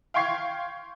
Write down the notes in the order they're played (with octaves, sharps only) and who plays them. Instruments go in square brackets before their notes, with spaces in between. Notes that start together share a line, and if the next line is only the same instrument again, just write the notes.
[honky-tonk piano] F5 G5 C6 C#6 G#6 C7